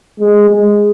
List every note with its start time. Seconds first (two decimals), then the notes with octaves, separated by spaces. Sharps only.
0.20 G#3
0.49 G#3